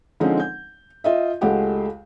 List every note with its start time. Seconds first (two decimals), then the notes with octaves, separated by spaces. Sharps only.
0.20 D3 F3 G#3 C4 C#4 D#4
0.40 G6
1.04 F4 D#5 E5
1.41 C#2 G#3 A3 G4 F#5